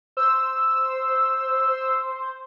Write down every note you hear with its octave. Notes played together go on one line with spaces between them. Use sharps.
C5 E6